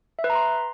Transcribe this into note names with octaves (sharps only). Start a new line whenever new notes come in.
E5
B4
A#5
C6